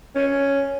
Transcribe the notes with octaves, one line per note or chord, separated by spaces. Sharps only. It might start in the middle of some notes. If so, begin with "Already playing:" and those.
C#4